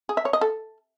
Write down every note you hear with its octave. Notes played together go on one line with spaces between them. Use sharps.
G#4
E5
C#5
D#5
A4